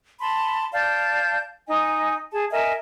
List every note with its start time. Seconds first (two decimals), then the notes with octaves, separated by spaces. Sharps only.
0.20 A5 B5 C6
0.74 D5 F5 A5 G6
1.68 D#4 D#5 G#5
2.32 G#4 A5
2.51 A#4 D#5 E5 G#5